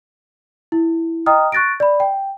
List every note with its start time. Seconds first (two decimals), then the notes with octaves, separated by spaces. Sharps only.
0.72 E4
1.26 D#5 G5 A#5 D#6 F6
1.52 C#6 F#6 A6 A#6 D7
1.80 D5 B5
2.00 G5